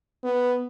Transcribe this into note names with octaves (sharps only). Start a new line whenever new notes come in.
B3